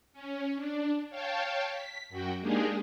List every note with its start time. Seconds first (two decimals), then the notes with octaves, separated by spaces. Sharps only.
0.13 C#4
0.56 D4
1.09 C#5 F5 G5 A5
1.69 B6
2.09 F#2 F#4 G5
2.41 G#3 A#3 D4 D#4 G4 G#4